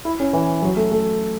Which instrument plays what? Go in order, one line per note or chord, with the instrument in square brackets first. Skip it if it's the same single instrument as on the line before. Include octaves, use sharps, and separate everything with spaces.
[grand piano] E4
C#4
E3
F#3
A3
A3